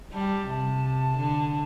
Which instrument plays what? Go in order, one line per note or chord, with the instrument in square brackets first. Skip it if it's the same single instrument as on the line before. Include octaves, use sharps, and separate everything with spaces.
[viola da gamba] G3 [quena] A5
[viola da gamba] C3 [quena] A5
[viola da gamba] D3